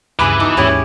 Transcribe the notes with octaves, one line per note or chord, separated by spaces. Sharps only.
D2 G2 C#3 E3 G#4 B4 B5 D6
B2 D#4 A4
D#2 G#2 C#4 E4 G4 G#4